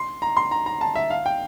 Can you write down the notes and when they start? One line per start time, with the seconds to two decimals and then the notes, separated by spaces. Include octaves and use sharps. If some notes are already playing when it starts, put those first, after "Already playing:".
Already playing: C6
0.22 A#5
0.37 C6
0.51 A#5
0.66 A#5
0.81 A5
0.95 E5
1.10 F5
1.26 G5